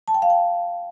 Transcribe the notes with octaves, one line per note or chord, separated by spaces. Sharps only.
A5
G5
F5
G5